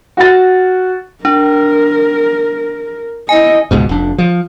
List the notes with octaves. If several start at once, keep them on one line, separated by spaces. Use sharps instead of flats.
F#4 F#5 A6
D4 A#4
E4 D#5 G#5
C#2 G#2 B2
F1 D4
F3